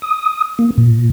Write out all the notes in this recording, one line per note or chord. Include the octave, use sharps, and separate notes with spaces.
D#6
A#3
A#2